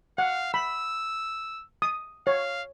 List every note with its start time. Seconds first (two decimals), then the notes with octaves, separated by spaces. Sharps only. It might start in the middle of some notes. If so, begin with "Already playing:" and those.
0.18 F5 F#5
0.54 B5 E6
1.82 D#6
2.27 C#5 F5